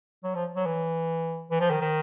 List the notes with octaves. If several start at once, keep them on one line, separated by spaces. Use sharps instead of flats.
F#3
F3
F#3
E3
E3
F3
D#3
D#3